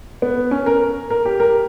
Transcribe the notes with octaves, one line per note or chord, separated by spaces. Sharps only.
B3
C#4
A#4
A#4
G4
A#4